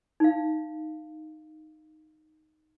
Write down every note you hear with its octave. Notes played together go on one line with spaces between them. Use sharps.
D#4 F5